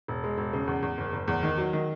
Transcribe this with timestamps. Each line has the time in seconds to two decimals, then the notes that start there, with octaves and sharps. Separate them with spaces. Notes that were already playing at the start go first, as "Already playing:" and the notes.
0.08 E1
0.24 G#3
0.38 E1
0.53 C#3
0.67 E2
0.83 E2
0.98 F#1
1.13 F#1
1.28 E2
1.43 D#3
1.58 F#3
1.73 D#3